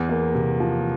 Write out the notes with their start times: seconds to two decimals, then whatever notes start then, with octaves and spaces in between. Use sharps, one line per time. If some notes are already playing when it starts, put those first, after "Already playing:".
Already playing: E2
0.09 A#3
0.35 C3
0.60 F3